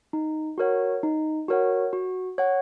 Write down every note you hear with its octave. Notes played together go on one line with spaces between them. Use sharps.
D#4
F#4 A#4 C#5 F#5
D#4
F#4 A#4 C#5 F#5
F#4
C#5 F#5